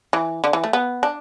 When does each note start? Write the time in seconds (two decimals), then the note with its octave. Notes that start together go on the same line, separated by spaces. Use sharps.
0.13 E3
0.44 D3
0.53 E3
0.64 A3
0.73 B3
1.03 D4